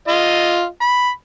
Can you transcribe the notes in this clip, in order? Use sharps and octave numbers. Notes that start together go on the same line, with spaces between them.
F4 D#5
B5